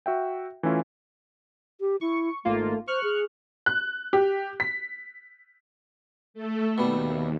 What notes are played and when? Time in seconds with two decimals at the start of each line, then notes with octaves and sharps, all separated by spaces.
0.06 F#4 E5 G5
0.63 E3 A3 C#4 E4 F4
1.80 G4
2.01 E4 C#6
2.45 G#1 A3 A#3 F4
2.87 C5 C#6 F6 F#6
3.03 G#4
3.66 F#6
4.13 G4
4.60 B6
6.34 A3 A4
6.78 D#2 B2 G3